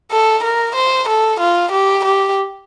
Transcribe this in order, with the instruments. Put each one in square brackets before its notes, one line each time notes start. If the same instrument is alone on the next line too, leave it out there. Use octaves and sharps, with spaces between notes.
[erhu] A4
A#4
C5
A4
F4
G4
G4